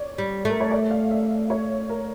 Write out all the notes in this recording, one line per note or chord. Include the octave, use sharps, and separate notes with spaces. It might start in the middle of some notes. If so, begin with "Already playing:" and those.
Already playing: C#5 D5
G3
A3 A#4
C#5
D5
F5
E5
C#5
A#4